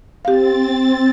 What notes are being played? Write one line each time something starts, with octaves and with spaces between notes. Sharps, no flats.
C4 G4 F5 A6